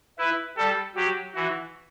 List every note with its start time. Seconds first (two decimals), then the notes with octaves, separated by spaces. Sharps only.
0.19 E4 B4
0.57 G3 A4
0.96 F#3 G4
1.34 E3 F#4